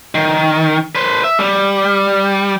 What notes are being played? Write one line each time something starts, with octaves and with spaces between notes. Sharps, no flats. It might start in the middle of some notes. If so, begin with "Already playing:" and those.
D#3
B4 C5
E5
G3